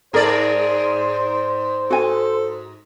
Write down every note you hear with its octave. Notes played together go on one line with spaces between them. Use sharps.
G#2 G#4 A#4 C5 D5
F#4 A4 G#5